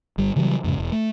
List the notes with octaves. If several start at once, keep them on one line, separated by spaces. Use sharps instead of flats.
G1 G3
C#3 E3 F#3 G3
F2 G#2 C#3
E1
A3